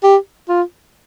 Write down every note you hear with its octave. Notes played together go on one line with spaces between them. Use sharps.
G4
F4